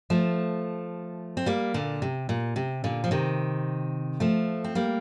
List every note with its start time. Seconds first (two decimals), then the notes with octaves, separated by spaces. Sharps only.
0.10 F3 A3
1.37 C4
1.46 G3 A#3
1.74 A#2 D3
2.02 C3
2.29 A#2
2.56 C3
2.84 A#2 D3
3.04 F3
3.11 C3 D#3
4.20 F3 A3
4.64 C4
4.75 G3 A#3